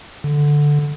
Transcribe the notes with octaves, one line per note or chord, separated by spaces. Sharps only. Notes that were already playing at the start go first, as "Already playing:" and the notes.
D3